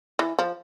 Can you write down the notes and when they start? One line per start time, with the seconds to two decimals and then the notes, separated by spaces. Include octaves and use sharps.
0.19 E3
0.39 F3